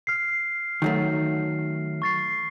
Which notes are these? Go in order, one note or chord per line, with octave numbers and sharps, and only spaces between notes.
F6 C7
D#3 F#3 A3
C#6 A6 C7